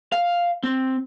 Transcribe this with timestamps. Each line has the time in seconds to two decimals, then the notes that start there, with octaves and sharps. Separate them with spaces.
0.12 F5
0.63 C4